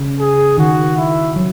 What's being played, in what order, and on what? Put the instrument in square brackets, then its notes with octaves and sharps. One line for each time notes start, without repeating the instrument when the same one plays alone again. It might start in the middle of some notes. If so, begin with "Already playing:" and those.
Already playing: [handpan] C#3
[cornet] G#4
[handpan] D#3 [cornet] F#4
[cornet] E4
[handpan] F#3